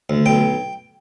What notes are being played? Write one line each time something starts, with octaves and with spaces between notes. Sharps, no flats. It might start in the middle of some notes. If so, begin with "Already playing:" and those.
D2
B1 G5